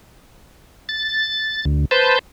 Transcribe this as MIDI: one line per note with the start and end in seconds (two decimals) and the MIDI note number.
0.89 1.65 93
1.65 1.85 38
1.91 2.19 71
1.91 2.19 72
1.91 2.19 81
1.91 2.19 91